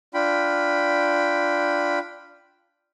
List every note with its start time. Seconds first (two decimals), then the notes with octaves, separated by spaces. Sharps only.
0.14 D4 F4 G5 B5